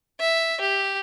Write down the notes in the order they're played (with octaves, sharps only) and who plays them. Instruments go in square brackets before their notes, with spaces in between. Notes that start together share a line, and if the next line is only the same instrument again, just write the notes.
[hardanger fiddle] E5
G4